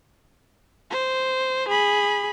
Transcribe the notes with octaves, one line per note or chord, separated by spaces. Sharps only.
C5
G#4 B5